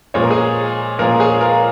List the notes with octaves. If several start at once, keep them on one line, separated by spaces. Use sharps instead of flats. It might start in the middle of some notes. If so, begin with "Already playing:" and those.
A#2 F3 G#3 C#5
A#4
G#4 C#5
A#2 F3 G#3 F4 A#4
G#4 C#5
F4 A#4